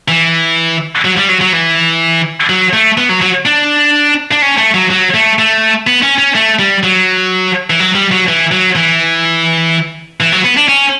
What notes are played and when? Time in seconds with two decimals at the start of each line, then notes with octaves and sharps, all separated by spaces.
0.08 E3
1.05 F#3
1.17 G3
1.29 F#3
1.41 F#3
1.53 E3
2.49 F#3
2.73 A3
2.98 B3
3.09 F#3
3.21 F#3
3.46 D4
4.31 D4
4.42 C#4
4.58 A3
4.74 F#3
4.90 F#3
5.14 A3
5.39 A3
5.87 B3
6.02 C#4
6.18 C#4
6.35 A3
6.59 G3
6.83 F#3
7.70 E3
7.80 F#3
7.95 G3
8.12 F#3
8.28 E3
8.52 F#3
8.75 E3
10.20 E3
10.32 F#3
10.44 B3
10.57 D4
10.68 C#4